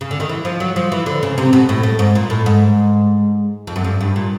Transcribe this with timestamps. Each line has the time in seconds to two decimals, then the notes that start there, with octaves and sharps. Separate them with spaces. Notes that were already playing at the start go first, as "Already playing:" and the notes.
0.01 C#3
0.11 D3
0.20 D#3
0.29 E3
0.45 F3
0.60 F#3
0.76 F3
0.92 E3
1.06 D3
1.23 C#3
1.38 C3
1.53 B2
1.69 A2
1.83 A2
1.99 G#2
2.15 A#2
2.30 A2
2.46 G#2
3.67 F2
3.76 F#2
3.84 G2
4.01 G2
4.16 A#2